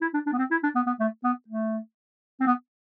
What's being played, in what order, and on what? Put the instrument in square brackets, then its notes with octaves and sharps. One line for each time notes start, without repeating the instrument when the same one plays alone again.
[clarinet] E4
D4
D4
B3
C4
E4
D4
B3
B3
A3
B3
A3
C4
B3